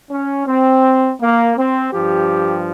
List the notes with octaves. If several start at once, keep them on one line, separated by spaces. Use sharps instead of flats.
C#4
C4
A#3
C4
G2 F3 G4